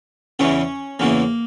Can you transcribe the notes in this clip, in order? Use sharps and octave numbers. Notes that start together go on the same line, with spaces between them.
E2 C#3 E3 C#4
E2 C#3 E3 A#3